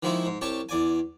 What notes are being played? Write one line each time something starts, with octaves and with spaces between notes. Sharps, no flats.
D#3 F3 G#3 A#3 E4
G#2
C2 G4 C#5 A5
E2 D5 G#5